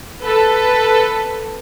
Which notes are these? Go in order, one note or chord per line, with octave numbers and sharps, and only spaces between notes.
A4 B4